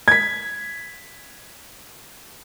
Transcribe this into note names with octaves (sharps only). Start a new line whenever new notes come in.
G#6 B6